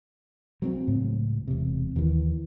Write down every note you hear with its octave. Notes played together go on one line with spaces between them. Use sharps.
F#3 A3 C4
C#2 A2
E1 C3
D#2 E3